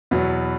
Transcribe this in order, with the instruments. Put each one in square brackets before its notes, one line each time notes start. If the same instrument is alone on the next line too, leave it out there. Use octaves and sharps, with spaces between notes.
[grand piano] E2 B2 F#3 B3